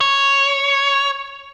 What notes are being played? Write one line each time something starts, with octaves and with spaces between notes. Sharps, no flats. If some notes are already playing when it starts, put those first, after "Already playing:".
C#5